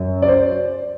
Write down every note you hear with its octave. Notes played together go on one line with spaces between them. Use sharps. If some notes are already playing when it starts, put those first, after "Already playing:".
Already playing: F#2 F#3
D5
C5